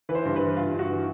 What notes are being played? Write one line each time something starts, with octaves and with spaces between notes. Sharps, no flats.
E3 B4
C5
G2
B4
E3
G2 F4
G2
F#4
E3